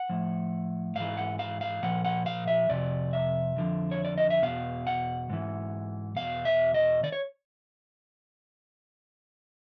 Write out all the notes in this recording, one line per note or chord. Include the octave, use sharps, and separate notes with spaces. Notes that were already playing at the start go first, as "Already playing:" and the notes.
Already playing: F#5
A2 F3
G#2 E3 F5
F#5
F5
F5
A#2 F3 F#5
F#5
F5
E5
F2 C3 D5
E5
F2 D3 F3
C#5
D5
D#5
E5
E2 B2 F5
F#5
G#2 E3
E2 B2 F5
E5
D#5
D#3 D5
C#5